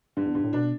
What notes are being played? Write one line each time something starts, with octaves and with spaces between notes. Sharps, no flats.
G2 D3
E2
G2 D3
A2
B2 D4